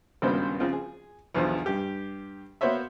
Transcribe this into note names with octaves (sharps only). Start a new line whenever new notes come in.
G#1 C#2 G2 A#3 B3 C5
C#3 F3 C4 F4
G#4
B1 E2 B2 D3 F3
G2 G4
A#3 B3 F#4 C5 C#5 E5